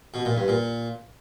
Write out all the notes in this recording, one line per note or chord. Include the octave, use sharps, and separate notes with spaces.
B2
A#2
G2
A#2